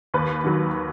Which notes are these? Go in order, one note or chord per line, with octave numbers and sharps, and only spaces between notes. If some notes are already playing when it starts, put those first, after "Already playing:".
D#2 B4
D#3 F#3